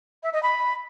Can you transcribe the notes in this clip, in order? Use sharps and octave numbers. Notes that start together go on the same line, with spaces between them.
E5
D#5
B5